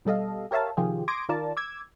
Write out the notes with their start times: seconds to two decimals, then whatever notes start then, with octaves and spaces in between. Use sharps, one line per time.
0.05 B2 G3 A4 D#5 F5
0.51 G4 A#4 C#5 E5 F5 A5
0.77 C3 D#3 F3 F4 G4 G#4
1.08 C6 D6 D#6 G#6 A#6 D7
1.29 D#3 F4 A#4 D5 A5
1.57 D6 E6 G#6